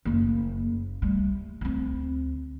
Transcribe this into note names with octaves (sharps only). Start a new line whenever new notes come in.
F#1 A#3
G3 A3
D2 C4